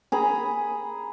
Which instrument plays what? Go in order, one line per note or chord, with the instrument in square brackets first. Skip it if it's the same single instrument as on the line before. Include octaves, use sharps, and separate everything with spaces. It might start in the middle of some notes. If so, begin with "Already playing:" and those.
[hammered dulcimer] G#4 A#5 B5